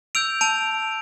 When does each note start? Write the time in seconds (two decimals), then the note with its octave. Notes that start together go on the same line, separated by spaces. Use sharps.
0.15 E6 G6 D7 F7
0.41 A5 D7 F7